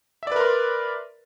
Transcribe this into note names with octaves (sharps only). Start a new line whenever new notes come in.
A#4 B4 D5 E5 C6